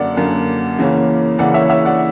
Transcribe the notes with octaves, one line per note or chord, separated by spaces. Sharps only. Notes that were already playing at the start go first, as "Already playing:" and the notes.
Already playing: F#2 D3 A#3 D5 F#5
F#2 D3 A#3
C#3 E3 A#3 C#4
C#3 E3 A#3 C#4 D5 F#5
C#5 E5
C#5 E5
D5 F#5